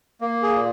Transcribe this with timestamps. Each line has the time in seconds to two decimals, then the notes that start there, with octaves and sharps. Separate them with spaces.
0.21 A#3
0.43 G#4
0.54 A#2